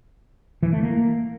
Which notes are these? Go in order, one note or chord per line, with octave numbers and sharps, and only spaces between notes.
E3
A3
A#3